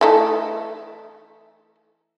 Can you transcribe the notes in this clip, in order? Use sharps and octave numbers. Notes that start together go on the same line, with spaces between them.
E3 A3 D#4